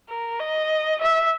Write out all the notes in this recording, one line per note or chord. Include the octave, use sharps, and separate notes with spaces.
A#4
D#5
E5